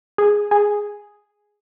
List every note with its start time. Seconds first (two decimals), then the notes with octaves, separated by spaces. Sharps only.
0.18 G#4
0.51 G#4